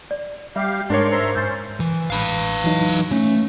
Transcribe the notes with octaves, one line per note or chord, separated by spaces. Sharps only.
D5
G3 G4 E5 F5 C7
G#2 D4 A#4 C#5 D5 C6
C5 E5 A#5 C6
C#4 C5 G6 A6
E3
A1 B4 F5 B5
E3 F#3 D#4
A3 C#4